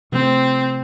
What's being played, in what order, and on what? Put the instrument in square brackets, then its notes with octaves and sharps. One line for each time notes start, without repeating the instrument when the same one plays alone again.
[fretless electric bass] C3 F3 A3 [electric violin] C4